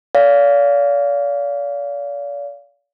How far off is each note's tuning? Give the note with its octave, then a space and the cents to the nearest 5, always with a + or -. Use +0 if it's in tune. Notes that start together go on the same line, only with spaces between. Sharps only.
D5 -45 F5 +0